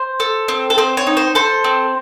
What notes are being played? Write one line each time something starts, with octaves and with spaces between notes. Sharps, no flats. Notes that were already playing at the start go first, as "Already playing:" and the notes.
Already playing: C5
A4
C4
A4
C4 C5
C#5
D#4
C5
A4 C5
C4